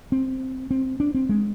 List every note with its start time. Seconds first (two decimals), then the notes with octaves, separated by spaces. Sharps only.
0.12 C4
0.71 C4
1.00 D4
1.14 C4
1.29 G#3